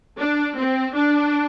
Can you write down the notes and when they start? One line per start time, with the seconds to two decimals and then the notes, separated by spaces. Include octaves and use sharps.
0.18 D4
0.56 C4
0.94 D4